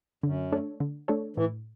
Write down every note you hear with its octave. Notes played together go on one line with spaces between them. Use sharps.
F#2 D3
A3 D4 A4 C#5
D3
A3 D4 A4 C#5
A2 E3